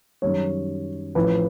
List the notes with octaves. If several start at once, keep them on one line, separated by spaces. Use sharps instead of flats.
F#2 D#3 G3 C#5
A1 A2 F3 B4